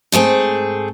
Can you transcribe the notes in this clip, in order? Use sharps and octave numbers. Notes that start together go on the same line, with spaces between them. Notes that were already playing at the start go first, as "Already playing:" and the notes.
G#2 A3 C4 G#4